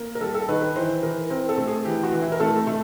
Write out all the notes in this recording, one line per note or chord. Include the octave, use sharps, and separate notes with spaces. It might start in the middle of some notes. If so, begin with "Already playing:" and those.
Already playing: A#3
A#4
G3 A4
A4
D#3 B4
B4
E3 C5
E3 A#4
C4 A#4
A4
A3
G#4
E3 G4
F#4
E3
E4
A#4
A3 A4
A3